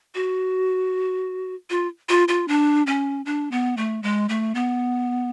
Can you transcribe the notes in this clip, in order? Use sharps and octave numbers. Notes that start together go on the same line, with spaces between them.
F#4
F4
F4
F4
D4
C#4
D4
B3
A3
G#3
A3
B3